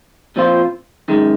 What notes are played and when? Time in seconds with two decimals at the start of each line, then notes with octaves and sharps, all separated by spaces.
0.36 A#2 F3 C4 F4 C5
1.08 F#2 D#3 G#3